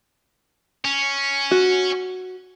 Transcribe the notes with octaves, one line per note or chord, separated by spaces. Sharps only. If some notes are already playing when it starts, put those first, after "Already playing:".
C#4
F#4